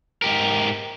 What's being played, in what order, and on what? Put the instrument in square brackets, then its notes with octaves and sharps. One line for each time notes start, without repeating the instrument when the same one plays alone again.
[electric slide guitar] G#2 G4 A#4